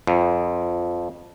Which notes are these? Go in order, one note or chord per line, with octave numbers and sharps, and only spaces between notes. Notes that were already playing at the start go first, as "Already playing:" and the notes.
F2